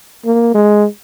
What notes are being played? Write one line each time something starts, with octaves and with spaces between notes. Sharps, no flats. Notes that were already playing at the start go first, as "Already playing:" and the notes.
A#3
G#3